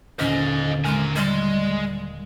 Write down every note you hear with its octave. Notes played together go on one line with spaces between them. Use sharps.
D#2 A#2 D3 C#4 C5 D#5
G#3 C#4 A#4 G#5
G3 G#3 C6